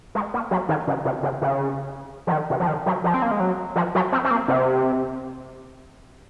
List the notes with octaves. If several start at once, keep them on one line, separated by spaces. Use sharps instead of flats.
G#3
A#3
F#3
D#3
C#3
C3
C#3
C#3
F3
D#3
C3
F3
D#3
F#3
F3
C4
A#3
G#3
F#3
F3
F#3
C4
C4
A#3
C3